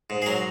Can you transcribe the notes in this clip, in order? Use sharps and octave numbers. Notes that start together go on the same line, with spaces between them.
G#2
G#4
F#3 A#4